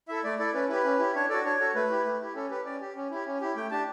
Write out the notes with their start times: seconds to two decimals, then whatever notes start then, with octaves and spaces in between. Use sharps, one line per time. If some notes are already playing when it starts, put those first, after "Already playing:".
0.08 E4 A4 E5
0.24 A3 D5
0.39 E4 A4 D5
0.54 C#4 B4
0.69 E4 G4 B4
0.84 C#4
0.99 E4 G4
1.15 D4 C#5
1.29 F#4 A4 D5
1.44 D4 C#5
1.60 F#4 A4
1.75 A3 B4
1.90 E4 G4
2.05 A3
2.20 E4 G4
2.35 C#4 A4
2.50 G4 B4
2.65 C#4 D5
2.81 G4
2.96 C#4
3.11 E4 G4
3.26 C#4
3.41 E4 G4
3.56 A3 G5
3.71 D4 G4 A5